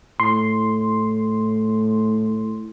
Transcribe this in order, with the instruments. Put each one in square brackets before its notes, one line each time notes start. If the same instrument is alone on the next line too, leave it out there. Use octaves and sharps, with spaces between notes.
[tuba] A2 [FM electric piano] C6